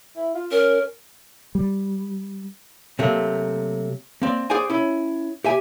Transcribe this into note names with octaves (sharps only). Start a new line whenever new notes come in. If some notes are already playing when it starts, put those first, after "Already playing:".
E4
F4
C#4 A#4
G3
C3 F#3 A3 A#3
A#3 C4 D5
G#4 C5 D5 F#5 G#5
C#4 E4
G4 E5 G#5